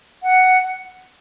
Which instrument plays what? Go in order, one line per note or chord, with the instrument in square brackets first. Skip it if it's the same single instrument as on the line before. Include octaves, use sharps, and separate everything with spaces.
[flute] F#5